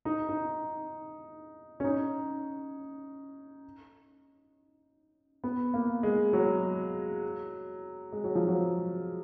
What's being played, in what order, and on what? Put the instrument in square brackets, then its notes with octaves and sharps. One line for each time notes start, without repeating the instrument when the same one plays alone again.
[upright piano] D#4
D#4
C#4
D#4
B3
A#3
G#3
F#3
G#3
F#3
F3
F#3